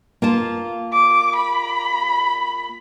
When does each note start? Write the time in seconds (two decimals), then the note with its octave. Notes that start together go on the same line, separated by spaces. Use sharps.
0.22 A#3 F4 A5
0.93 D6
1.35 B5